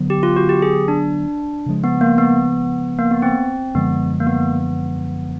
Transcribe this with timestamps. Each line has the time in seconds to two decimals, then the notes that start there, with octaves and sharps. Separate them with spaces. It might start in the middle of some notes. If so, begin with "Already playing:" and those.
Already playing: D3 F#3 B3
0.10 G4
0.23 F4
0.36 F#4
0.49 G4
0.62 G#4
0.88 D4
1.66 C#3 F3 G#3
1.84 B3
2.01 A#3
2.18 B3
2.99 A#3
3.11 B3
3.22 C4
3.75 F#2 D3 F3 G#3 B3
4.20 A#3
4.27 B3